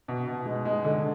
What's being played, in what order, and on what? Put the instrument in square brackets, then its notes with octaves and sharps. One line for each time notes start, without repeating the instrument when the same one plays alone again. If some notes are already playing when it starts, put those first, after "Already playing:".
[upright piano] B2
B2
G#3
G#3
D3